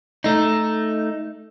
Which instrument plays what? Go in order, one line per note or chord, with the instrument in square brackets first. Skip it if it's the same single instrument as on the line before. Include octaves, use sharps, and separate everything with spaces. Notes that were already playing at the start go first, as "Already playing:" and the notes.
[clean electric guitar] A3 D#4